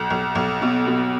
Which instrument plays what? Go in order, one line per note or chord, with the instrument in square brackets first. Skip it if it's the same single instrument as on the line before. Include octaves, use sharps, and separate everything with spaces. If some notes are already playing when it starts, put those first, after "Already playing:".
Already playing: [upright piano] B1
B1
B1
B2
B2